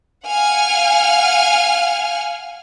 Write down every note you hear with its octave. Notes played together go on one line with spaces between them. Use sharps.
F5 F#5 G#5 F6